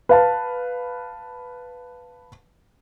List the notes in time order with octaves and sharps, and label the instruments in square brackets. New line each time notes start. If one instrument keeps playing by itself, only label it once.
[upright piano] B4 F5 A5